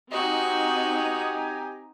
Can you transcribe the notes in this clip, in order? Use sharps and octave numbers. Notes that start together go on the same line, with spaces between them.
C4 D#4 F#4 G4 D#5 G#5 A#5